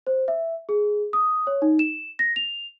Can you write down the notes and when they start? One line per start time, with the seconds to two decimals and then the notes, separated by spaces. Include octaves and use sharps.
0.07 C5
0.28 E5
0.69 G#4
1.13 D#6
1.47 C#5
1.62 D#4
1.79 E7
2.19 A#6
2.36 F7